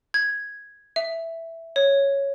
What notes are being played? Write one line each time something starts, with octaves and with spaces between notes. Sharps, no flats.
G#6
E5
C#5